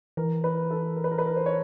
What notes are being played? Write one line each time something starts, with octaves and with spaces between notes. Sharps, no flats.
E3 A#4
B4
A4
A#4
B4
A#4
B4
A#4
C5
C#5